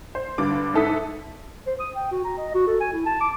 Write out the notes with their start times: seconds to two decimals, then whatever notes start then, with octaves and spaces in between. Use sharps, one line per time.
0.15 C5
0.38 G2 D3 D6
0.74 G#2 E4 A4 D#6 B6
1.67 C5
1.80 D#6
1.95 G5
2.12 F#4
2.24 A#5
2.38 D#5
2.54 F#4
2.67 A4
2.80 G#5
2.93 E4
3.06 A5
3.21 D6